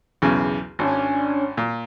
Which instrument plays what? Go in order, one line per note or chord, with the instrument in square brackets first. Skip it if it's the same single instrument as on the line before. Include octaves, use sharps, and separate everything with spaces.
[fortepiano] B1 E2 C#3
[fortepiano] G#1 [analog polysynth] C#4 D4
[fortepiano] A#2